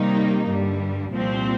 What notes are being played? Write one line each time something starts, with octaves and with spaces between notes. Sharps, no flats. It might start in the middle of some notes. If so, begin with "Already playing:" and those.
Already playing: C3 D#3 G3 A#3 D#4
G2 D3 G3
C2 A#2 F3 C4